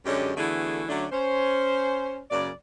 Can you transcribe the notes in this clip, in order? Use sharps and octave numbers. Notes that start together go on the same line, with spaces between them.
F#2 D3 G#3 C#4 G4
D3 E3 A3 B3 F#4 G#4
D3 F#3 A3 C#4 D4
C#4 C5
F#2 C#3 A#3 D5